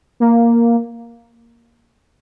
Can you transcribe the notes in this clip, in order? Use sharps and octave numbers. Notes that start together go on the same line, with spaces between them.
A#3